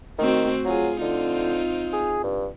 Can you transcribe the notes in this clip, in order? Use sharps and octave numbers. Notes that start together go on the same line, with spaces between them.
D#3 A3 C4 F#4
F#3 F4 G#4
D3 C4 D#4 F4
G#4
G2